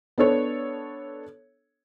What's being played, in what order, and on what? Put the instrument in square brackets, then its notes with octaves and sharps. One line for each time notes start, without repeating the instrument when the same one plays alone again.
[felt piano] B3 D4 A4 C#5